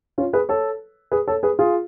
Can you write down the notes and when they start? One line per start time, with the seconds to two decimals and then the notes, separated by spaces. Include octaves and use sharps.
0.18 C#4 F4
0.33 G#4 B4
0.49 A4 C#5
1.12 G#4 B4
1.28 A4 C#5
1.43 G#4 B4
1.59 F4 G#4